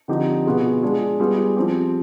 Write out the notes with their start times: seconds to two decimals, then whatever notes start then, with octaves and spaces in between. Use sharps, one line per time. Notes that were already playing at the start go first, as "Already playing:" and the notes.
0.08 D3 F3 C4 D#4 G4
0.46 B2 B3 F4 G#4
0.83 G#3 D4 F4 G#4
1.20 G3 B3 F4 G#4
1.56 F3 C4 G4